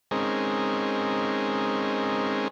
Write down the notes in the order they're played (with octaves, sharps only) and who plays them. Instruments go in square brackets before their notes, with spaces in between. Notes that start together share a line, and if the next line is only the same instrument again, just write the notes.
[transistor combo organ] G#3 C4 C#4 D#4 G#4 A#4